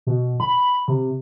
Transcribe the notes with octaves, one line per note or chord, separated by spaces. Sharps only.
B2
B5
C3